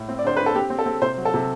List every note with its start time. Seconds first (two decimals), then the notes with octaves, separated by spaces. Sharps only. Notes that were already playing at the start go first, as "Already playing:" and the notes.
Already playing: A2
0.09 C4
0.19 D5
0.24 D3 C5
0.36 D3 B4
0.46 A4
0.55 C4 G4
0.70 C4
0.79 A4
0.86 C4
1.02 C3 C5
1.17 F#3
1.25 A4
1.34 C3